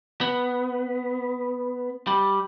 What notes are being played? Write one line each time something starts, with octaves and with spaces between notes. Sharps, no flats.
B3
G3